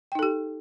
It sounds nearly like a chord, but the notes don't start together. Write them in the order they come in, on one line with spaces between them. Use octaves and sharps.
G5 D#4 A4 G4